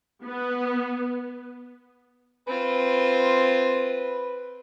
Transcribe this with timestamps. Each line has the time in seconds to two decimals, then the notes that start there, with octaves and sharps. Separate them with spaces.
0.23 B3
2.47 C4 F4 B4